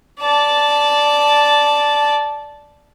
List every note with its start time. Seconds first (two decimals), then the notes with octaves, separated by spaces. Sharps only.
0.20 D5 A5